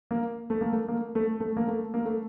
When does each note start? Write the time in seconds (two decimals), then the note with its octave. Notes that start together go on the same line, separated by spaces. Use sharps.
0.11 A#3
0.50 A3
0.61 A#3
0.72 A3
0.88 A#3
1.15 A3
1.40 A3
1.57 A#3
1.67 A3
1.94 A#3
2.05 A3